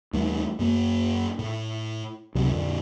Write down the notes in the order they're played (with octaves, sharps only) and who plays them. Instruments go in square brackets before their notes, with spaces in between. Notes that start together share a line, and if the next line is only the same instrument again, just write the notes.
[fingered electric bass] D#2 E3 G3 A3
F#2 A#3
A2
D#1 C#2 C3 F#3
F2 A#2 D3